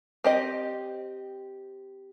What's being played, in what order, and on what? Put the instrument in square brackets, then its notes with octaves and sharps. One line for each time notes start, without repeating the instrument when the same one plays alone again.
[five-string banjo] C4 G4 D#5